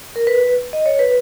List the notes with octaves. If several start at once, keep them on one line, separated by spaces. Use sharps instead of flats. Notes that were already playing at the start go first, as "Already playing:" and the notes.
A#4
B4
D#5
C#5
B4